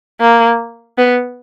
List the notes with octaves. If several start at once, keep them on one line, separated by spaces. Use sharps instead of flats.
A#3
B3